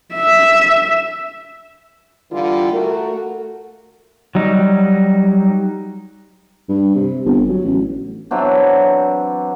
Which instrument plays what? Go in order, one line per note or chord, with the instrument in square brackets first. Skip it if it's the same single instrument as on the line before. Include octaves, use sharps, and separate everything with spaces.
[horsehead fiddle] E5
[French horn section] D3 E3 G3 F4
A3 F#4 A#4
[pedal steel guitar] F#3 G3 D#4
[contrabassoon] G2
C3
G1
F#3
A1
[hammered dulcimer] E3 F#3 C4 D4